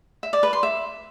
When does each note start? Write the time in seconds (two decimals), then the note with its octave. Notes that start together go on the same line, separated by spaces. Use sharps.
0.23 E5
0.33 D5
0.43 B4
0.53 C6
0.63 E5